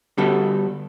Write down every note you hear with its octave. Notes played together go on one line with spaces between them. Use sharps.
D3 G3 B3 F#4 A4